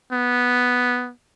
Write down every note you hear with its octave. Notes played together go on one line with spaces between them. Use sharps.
B3